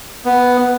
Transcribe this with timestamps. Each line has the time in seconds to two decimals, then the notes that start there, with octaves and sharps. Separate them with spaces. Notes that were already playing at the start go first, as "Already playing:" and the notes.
0.25 B3